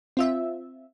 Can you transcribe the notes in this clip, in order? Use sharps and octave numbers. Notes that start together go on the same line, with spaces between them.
C4 F4 E5